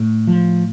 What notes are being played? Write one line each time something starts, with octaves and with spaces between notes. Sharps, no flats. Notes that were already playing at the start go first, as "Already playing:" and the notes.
Already playing: A2
F3